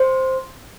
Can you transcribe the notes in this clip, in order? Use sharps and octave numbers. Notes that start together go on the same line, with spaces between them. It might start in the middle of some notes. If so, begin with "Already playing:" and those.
Already playing: C5